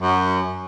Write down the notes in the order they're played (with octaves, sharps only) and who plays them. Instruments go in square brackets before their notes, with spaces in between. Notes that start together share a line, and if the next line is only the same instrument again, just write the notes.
[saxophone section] F#2